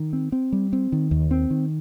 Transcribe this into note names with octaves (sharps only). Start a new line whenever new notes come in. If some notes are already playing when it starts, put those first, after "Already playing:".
Already playing: D#3
C4
C4
G3
C4
D#3
D#2
C4
D#3